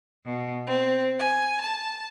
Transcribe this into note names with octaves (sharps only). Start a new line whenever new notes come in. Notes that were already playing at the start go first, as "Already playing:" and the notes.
B2
C4
G#5
A5